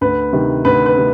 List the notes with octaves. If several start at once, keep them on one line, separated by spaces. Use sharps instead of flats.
D2 B4
C3 D#3
D2 B4
B4
C3